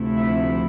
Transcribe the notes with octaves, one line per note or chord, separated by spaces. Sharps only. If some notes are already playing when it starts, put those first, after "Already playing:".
Already playing: D2 C3 F3 A3 E4
E5